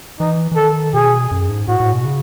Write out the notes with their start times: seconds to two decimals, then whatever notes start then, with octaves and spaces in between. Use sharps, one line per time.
0.20 E3 D#4
0.52 E3
0.56 D#3 A4
0.94 B2 G#4
1.31 F#2
1.49 G#2
1.68 A2 F#4
1.80 A2
1.92 B2
2.05 C#3